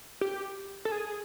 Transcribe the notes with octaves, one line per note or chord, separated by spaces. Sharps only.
G4
A4
G#4